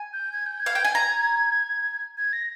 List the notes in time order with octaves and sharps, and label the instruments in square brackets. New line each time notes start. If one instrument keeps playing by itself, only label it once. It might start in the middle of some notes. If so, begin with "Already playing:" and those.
Already playing: [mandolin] G#5
[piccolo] G6
G#6
G6
G#6
[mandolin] F5
G5
G#5
A#5
[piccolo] G#6
A#6